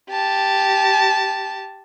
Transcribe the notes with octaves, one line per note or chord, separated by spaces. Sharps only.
G4 A5